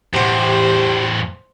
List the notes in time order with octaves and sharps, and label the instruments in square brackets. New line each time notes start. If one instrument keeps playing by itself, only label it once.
[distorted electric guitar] E2 A2 [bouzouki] F#4 G4 [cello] C5